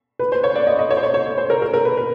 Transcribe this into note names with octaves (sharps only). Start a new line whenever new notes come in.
B4
C5
C#5
D5
D#5
D#5
C#5
C5
C#5
C#5
C#5
C5
A#4
A#4
A#4
B4
B4